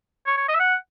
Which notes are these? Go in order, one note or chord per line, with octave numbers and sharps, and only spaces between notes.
C#5
C#5
D#5
E5
F#5